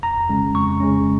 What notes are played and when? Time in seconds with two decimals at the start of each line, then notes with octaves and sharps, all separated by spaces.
0.03 F2 A#5
0.29 C#3 G#3 C#4
0.54 F2 C#6
0.80 C#3 G#3 C#4